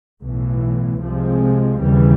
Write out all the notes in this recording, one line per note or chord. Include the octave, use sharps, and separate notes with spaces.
B1 A2 E3
C2 C3 F3 G#3 C4
D#2 C#3 E3 G3